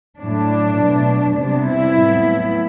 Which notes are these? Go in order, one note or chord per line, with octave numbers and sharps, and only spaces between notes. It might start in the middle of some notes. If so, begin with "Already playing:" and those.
A2 F#3 A3 D4
B2 F#3 A3
C3 G3 B3 D4
E4
A2 F#3 B3